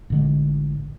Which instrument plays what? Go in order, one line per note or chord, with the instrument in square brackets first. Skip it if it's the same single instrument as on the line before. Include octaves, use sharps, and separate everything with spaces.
[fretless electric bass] A1 D3 G#3